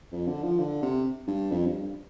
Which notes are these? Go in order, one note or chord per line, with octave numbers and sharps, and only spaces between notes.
F2
D3
F3
D3
C3
G2
F2
G2
G2